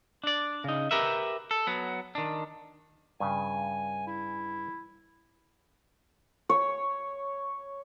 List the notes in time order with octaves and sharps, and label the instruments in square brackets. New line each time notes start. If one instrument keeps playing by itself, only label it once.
[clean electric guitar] D4 D5
C#3 D#4
G4 A#4 B4 E5
A4
F#3 B3
D#3 D4
[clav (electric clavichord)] G2 C#3 [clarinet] G#5
[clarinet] E4
[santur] C#5